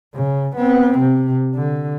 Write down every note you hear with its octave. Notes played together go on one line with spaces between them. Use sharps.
C#3
B3 C4
C3
D3